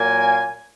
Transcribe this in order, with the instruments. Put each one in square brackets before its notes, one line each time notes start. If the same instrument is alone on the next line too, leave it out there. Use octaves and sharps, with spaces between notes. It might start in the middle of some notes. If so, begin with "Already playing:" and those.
Already playing: [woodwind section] A#2 F#3 A#3 G#5